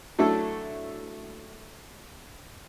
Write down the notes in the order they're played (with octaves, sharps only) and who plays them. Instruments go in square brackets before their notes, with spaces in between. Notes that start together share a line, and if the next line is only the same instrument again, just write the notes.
[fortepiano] F#3 A3 D4 E4 A4